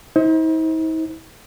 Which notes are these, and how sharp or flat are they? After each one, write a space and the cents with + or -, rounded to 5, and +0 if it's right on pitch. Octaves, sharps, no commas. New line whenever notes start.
D#4 +45 C5 +10